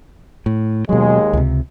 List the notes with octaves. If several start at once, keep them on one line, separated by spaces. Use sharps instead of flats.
A2
D#2 B2 F#3 G#3
C#2 C3